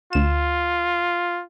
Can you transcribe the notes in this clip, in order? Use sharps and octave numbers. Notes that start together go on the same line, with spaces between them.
D2 F4 E7